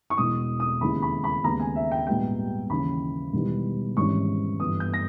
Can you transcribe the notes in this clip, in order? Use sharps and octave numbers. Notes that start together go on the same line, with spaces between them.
C#6
E1 E2 B2 D#6
D#6
D#2 C#3 G#3 B3 E4 B5
B5
B5
D#2 C#3 G#3 B3 A#5
G#5
E5
G5
A#1 G#2 G3 B3 G5
D#2 C#3 E3 B5
E1 E2 D#3 G3 B3
G#1 G#2 E3 G3 C#4 C#6
G1 G2 E3 G3 B3 D#6
G6
A#6